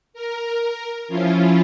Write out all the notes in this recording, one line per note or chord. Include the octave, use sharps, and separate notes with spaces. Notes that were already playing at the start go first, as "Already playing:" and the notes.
A#4
F3 C#4 E4 F4